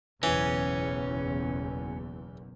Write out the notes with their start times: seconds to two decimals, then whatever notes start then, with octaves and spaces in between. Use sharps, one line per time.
0.23 F#1 B1 E2 E3 C#4